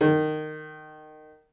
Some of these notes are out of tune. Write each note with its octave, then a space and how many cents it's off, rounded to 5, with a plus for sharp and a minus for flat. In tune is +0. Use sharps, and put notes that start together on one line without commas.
D#3 -15